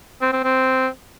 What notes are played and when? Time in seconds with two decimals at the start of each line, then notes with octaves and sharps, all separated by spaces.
0.22 C4
0.33 C4
0.44 C4